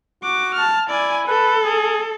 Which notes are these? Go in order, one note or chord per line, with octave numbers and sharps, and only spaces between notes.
F#4 D6
A5 F6
E4 D5 G#5
A4 B4
G#4